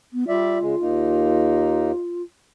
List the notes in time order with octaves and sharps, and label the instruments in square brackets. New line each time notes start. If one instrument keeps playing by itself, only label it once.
[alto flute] B3
[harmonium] G3 D5 E5 [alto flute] F4
[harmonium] C#3 G#3
D#2 A#3 D#4